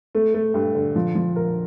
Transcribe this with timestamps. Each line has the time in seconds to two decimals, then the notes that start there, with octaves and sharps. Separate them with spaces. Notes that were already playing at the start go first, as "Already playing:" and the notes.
0.15 A3
0.34 A3
0.54 G2
0.75 D3
0.95 F3
1.15 F3
1.36 A#4